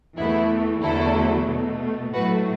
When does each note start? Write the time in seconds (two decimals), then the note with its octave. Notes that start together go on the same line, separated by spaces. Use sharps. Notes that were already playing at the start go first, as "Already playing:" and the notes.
0.18 E2 E3 A3 B3 E4
0.83 E2 D3 F#3 A3 E4 A4
1.48 B2 A3
2.14 A2 F#3 A3 F#4 B4